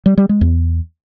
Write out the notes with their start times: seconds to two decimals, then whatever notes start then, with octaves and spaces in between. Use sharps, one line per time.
0.06 G3
0.18 G3
0.29 G#3
0.41 E2